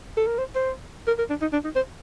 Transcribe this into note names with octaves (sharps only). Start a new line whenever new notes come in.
A4
A#4
C5
C5
A#4
A#4
D4
D#4
D4
D#4
C5